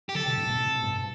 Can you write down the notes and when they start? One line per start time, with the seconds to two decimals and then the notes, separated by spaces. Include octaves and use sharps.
0.09 G4
0.15 D3 F#3 A4
0.26 B2 D3
0.37 A2 C3
0.49 G2 B2
0.60 A2 C3
0.83 G2 B2